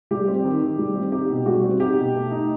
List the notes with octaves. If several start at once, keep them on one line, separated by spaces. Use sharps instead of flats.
G3 G4
C4
D#3
D#3
G3
C4
D#4 G4
B2
G3 F#4
C4
D#4 G4
B2
A3
D#4